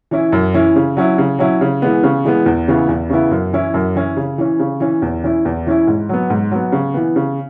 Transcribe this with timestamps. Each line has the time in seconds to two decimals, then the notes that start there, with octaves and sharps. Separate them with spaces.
0.11 E3 C#4 E4
0.32 F#2
0.54 E3 C#4 E4
0.76 C#3
0.97 F#3 C#4 E4
1.18 C#3
1.39 F#3 C#4 E4
1.61 C#3
1.82 E3 G#3 B3
2.03 C#3
2.25 E3 G#3 B3
2.46 E2
2.68 C#3 E3 B3 E4
2.89 E2
3.10 C#3 E3 B3 E4
3.31 F#2
3.53 E3 C#4 E4
3.74 F#2
3.95 E3 C#4 E4
4.17 C#3
4.38 E3 C#4
4.59 C#3
4.80 E3 C#4
5.02 E2
5.24 E3 C#4 E4
5.45 E2
5.66 E3 C#4 E4
5.87 G#2
6.09 F#3 B3
6.30 G#2
6.51 F#3 B3
6.72 C#3
6.94 E3 B3
7.16 C#3